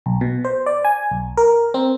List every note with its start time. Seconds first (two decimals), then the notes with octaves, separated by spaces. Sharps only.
0.06 B1
0.21 B2
0.45 C5
0.66 D5
0.85 G#5
1.11 B1
1.37 A#4
1.74 C4